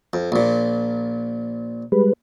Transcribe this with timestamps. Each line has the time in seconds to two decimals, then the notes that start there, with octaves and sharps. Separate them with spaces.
0.13 F2
0.32 A#1 A#2
1.92 G3 G#3 B4